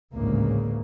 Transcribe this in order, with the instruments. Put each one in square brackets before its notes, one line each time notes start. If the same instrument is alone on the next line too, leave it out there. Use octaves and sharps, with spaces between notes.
[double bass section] A1 D2 G#2 C#3 E3 A#3